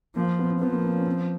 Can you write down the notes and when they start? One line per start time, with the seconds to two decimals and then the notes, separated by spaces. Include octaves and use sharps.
0.16 F3 A#3
0.39 B3
0.50 C4
0.61 F3 B3
0.72 A#3
0.84 C4
0.95 C#4
1.06 C4